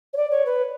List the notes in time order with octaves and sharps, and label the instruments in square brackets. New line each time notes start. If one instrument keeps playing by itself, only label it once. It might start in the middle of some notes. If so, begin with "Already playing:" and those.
[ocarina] C#5
D5
C#5
B4